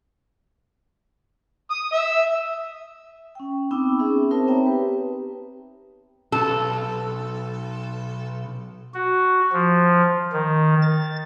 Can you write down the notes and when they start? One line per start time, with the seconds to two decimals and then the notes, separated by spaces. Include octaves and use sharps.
1.70 D#6
1.92 E5
3.35 C#4 G5
3.71 B3 C4 D#4 G5 D6 E6
3.99 B3 C#4 G#4 E5
4.31 C4 D#4 A#4 C5 E5 A5
4.47 B3 C4 C#5 E5 G5 A#5
4.66 G4 B4
6.32 B1 A4
8.94 F#4
9.53 F3
10.33 D#3
10.82 A6